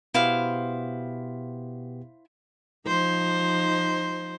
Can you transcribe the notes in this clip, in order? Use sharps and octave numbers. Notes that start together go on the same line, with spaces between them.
B2 B3 E4 G4 C5 F5
F3 D#4 C5